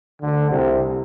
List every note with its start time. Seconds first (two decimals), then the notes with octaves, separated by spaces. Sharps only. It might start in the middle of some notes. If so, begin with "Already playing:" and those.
0.22 D2 D3
0.50 C2 C3